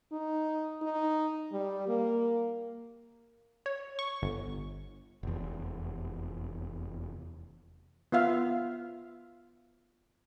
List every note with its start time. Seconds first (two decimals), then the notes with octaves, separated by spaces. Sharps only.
0.12 D#4
0.82 D#4
1.52 G3
1.88 A#3
3.66 C#5
3.99 C#6
4.22 G1
5.23 F1 E2
8.12 B3 F4 E5 F5